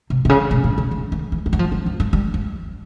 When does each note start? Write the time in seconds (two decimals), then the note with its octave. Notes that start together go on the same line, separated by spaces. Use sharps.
0.10 C3
0.25 C3
0.29 C#3
0.51 B2
0.64 A#2
0.78 C#3
0.91 D3
1.12 D#3
1.32 E3
1.46 E3
1.53 F#3
1.59 F3
1.72 E3
1.86 E3
2.00 F#3
2.13 G3
2.34 F3